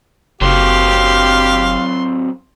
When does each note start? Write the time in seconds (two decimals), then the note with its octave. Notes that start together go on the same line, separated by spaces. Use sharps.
0.41 F#1 F#3 C4 G4 F5 C6